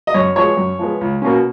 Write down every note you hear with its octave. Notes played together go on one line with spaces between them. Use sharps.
D#5
F#2 C#5
F3 G#3 B3 C#5
F#2
F3 G#3 B3
C#2
B2 A#3 C#4